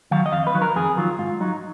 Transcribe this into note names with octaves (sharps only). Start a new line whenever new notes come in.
D#3 F#3 F5
D#5
F2 F5
B4
D#3 F#3
A#4
F2 G#4
D#3 F#3 F4
G#2 F4
F#3 D#4